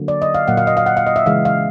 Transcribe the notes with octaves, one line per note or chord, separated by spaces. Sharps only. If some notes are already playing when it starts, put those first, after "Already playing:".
Already playing: D3 F#3 A#3
D5
D#5
F5
A#2 F#3 A#3 F#5
F5
D#5
F5
F#5
F5
D#5
E5
C#3 E3 G#3 F5
F5